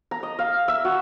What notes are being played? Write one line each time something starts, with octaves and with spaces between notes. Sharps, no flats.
A#5
D#5
F5
E5
F#4